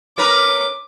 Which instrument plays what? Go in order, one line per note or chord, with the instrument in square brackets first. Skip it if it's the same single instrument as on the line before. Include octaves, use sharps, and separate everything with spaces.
[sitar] C#4 A#4 B4 [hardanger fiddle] D6